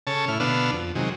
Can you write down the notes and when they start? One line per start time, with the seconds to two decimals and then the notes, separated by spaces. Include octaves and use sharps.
0.07 C#3 A4 C#5 A5
0.28 A2 E4 F6
0.40 B2 D3 B3 D4 F5 E6
0.72 F2
0.95 C3 D#3 F#3 G#3